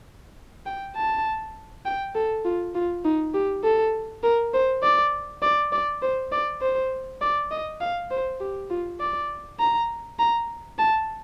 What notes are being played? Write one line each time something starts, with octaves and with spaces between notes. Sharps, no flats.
G5
A5
G5
A4
F4
F4
D#4
G4
A4
A#4
C5
D5
D5
D5
C5
D5
C5
D5
D#5
F5
C5
G4
F4
D5
A#5
A#5
A5